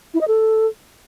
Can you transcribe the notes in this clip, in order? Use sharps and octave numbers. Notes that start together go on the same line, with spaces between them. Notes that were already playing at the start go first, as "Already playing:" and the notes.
E4
D#5
A4